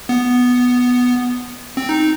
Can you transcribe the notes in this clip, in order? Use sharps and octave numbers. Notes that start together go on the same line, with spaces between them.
B3
C4
D#4